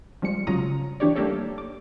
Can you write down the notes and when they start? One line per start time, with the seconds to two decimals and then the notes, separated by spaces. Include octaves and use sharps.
0.22 F3 G3 G#3 C#7
0.47 C#3 F#3 F4 A#5 D#6
1.00 E3 D4 G4 C#5 D5
1.16 G3 A3 A#3 G4 A4 C#5
1.58 D6